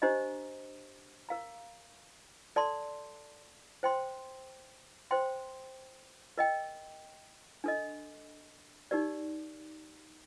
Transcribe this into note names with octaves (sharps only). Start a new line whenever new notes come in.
D4 G4 C5 D#5 A#5
A#4 F5 A#5
A4 D5 A5 C6
C5 G5 C6
C5 G5 C6
A#4 D#5 G5
D4 A4 D#5
D#4 G4 A#4 D5